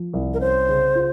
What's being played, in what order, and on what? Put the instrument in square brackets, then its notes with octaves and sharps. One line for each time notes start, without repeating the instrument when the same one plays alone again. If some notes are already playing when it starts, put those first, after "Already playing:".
Already playing: [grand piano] F3
C2
[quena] A#4
[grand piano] C#4 [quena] C5
[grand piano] C#3
F4